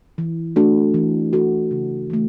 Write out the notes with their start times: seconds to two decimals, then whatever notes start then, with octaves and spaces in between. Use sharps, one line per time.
0.18 E3
0.56 A3 D4 F#4 A4
0.94 E3
1.33 A3 D4 F#4 A4
1.71 C#3
2.10 E3 A3